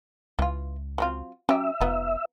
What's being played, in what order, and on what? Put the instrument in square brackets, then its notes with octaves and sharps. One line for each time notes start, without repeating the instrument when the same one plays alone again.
[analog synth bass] C#2 [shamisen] E3 F4
[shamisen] F#3 C4 F4
[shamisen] F#3 G4 [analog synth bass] C#4 [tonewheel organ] E5
[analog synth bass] F1 [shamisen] F3 B3 D#4